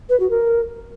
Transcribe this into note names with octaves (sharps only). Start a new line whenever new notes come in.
B4
F#4
A#4